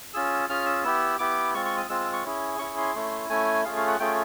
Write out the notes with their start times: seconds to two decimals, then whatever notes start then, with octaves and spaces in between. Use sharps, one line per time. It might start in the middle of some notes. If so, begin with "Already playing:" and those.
0.14 C#4 F4 G#4 E6
0.49 C#4 F4 G#4 F6
0.66 E6
0.84 B3 E4 G4 E6
1.19 B3 E4 G4 D6
1.54 G#3 C4 F4 C#6
1.65 C#6
1.77 D#6
1.89 G#3 C4 F4 E6
2.01 E6
2.13 C#6
2.25 C#4 E4 G#4
2.59 C#4 E4 G#4 C#6
2.77 C6
2.95 A3 C#4 E4
3.29 A3 C#4 E4 G#5
3.65 A3 C#4 F4 G#4 F5
3.76 F5
3.88 F#5
4.00 A3 C#4 F4 G#4 G5